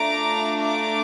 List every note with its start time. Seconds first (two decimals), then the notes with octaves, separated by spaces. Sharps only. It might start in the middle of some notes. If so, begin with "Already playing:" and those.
Already playing: A3 D4 F4 A#5 D6
0.59 A#5 D6